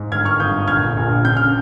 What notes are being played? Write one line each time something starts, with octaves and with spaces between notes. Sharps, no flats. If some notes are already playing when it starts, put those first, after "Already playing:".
Already playing: G#2
G1 F6 G#6
C#6 F6
G1 D#6 G6
A#1 F6 G#6
A#1
C#3 G6
F6